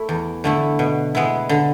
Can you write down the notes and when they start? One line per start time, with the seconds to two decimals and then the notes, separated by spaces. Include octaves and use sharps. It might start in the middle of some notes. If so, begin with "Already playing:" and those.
Already playing: A3 E4
0.09 E2
0.44 D3 A3 E4
0.79 B2
1.15 G#3 B3 E4
1.49 D3